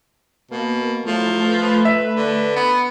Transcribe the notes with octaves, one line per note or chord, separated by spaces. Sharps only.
B2 A#3
F3 F#3 A3 E4
B4
E5
D3
B3